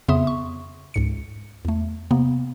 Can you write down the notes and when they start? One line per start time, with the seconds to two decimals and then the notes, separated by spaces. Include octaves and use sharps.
0.08 F2 C#3 B3 E5 C6 D#6
0.27 C#6
0.94 C#2 G#2 C#7
1.65 E2 A3
2.11 C3 A#3 B3